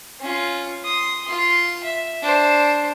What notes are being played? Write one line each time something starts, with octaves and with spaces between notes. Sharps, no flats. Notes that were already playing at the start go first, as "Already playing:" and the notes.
C#4 F4
C6 D#6
F4 C6
E5
D4 C5